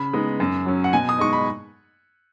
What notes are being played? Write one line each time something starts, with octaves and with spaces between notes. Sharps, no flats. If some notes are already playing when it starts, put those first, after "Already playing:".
Already playing: C#3 B5
G#3 B3 D#4
F#2
F#3 C#4
F#5
B2 G#5
D#6
G#3 D#4 C#6
B5